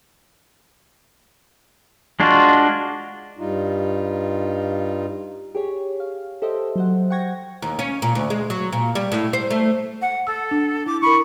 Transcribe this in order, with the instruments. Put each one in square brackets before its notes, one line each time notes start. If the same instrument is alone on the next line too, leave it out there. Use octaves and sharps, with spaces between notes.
[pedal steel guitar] G#3 D4 F4 F#4
[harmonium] G2 G3 D#4 F4
[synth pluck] G4 G#4 C#5
F5
G4 A4 C5 D#5 E5
F#3 C5 F#5
F#5 G5 C#6 G#6 A#6
[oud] D#2
C#4
A#2
D2
G#3
F#3
A#2
G3
A2
C5
A3
[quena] F#5
[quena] A4 [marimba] E6
[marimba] D4
[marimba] E4 [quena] D6
[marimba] E4 A#4 [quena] B5 [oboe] C#6